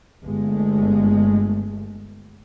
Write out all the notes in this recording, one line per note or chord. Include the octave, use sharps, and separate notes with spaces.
G1 G#3 A3